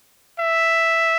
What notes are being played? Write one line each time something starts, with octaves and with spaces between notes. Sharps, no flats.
E5